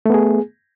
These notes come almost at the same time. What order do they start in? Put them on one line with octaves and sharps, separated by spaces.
A3 B3 G#4